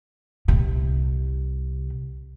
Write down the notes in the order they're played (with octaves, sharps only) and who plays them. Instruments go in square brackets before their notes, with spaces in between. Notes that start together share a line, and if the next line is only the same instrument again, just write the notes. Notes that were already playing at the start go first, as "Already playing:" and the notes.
[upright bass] C2 C3